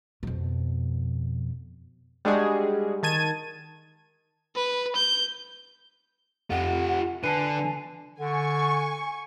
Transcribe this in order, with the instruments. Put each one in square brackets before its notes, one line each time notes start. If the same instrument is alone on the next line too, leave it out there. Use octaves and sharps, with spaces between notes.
[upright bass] F2 B2
[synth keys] G3 G#3 D4 F#4 G#4
D#3 A5 G#6 D#7
[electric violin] B4
G6
[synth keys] F2 [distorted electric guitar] F4 G4 [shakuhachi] F#5
[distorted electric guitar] D3 [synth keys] B4 [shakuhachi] G#5 [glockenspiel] A5 C7 D#7
[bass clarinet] D3 [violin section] G#5 C#6